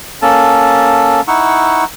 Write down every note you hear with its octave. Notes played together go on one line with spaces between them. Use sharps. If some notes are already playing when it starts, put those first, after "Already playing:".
A#3 C#4 A4 A5
D#4 E4 F#5 C#6 E6